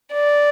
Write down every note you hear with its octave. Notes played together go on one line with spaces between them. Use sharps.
D5